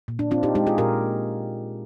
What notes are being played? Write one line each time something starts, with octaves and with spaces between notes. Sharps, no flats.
A#2
D4
C4 D4 F4
D#4 G4
G#3 D#4 G4
F4 G#4
A#2 G4 A#4